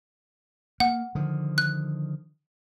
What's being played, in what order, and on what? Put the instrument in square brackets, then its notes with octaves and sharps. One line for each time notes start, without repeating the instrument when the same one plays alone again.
[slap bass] A#3 [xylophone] F#5
[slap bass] D3 D#3 F3
[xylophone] F#6